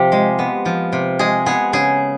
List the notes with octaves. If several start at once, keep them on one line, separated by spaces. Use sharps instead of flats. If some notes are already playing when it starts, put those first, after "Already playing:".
Already playing: C3 F3 G4
G#3
B3
F3
C3
G#3 G#4
B3 G#4
C#3 G#4